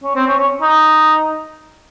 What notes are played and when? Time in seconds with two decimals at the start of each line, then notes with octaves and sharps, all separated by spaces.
0.03 C#4
0.15 C4
0.27 C#4
0.39 C#4
0.62 D#4